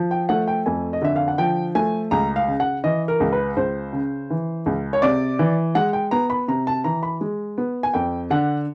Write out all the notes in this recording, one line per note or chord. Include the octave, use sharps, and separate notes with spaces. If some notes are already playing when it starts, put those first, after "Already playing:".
Already playing: F3
G5
A3 F#5
G5
F2 G#5
D#5
D3 E5
F5
F#5
F3 G5
A3 G#5
C#2 A#5
F5
C#3
F#5
E3 D#5
A#4
C#2
B4
C#2 C5
C#3
E3
C#2
C#5
C3 D5
E3
G#3 F#5
G5
B3 A#5
B5
C3 A#5
A5
E3 A#5
B5
G#3
B3
G#5
F2 G5
D3 F#5